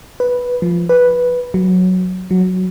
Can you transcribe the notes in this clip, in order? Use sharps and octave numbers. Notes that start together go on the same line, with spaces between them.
B4
F3
B4
F#3
F#3